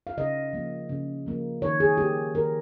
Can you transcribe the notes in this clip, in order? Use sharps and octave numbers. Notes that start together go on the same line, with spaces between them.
F5
C#3 D#5
F3 A#3
C#3
F3 A#3
D#3 C#5
G#4
A#3 G4
D#3 A#4